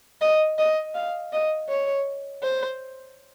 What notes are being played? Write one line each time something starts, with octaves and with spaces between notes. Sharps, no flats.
D#5
D#5
F5
D#5
C#5
C5